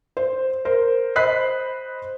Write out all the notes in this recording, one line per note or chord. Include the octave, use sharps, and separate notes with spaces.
C5
A#4 C5
C5 D#5 B5 F#6 B6 C7